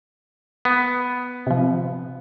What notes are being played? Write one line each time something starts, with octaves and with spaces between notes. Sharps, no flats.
B3
C3 F3